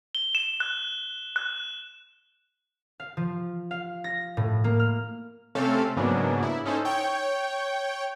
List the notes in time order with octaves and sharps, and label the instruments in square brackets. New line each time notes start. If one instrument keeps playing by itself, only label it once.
[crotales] G7
E7
F#6
F#6
[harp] F5
F3
F5
A#6
A2
A#3
F6
[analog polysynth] C3 A3 C4 C#4 A4 F5
G#2 C#3 F#3 A#3 B3 D4
E4
C#4 D#4 A4 C5
C#5 G5